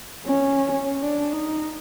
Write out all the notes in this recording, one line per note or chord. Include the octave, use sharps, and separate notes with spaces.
C#4
C#4
D4
D#4